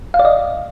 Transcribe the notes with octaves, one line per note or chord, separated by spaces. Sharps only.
F5
D5
D#5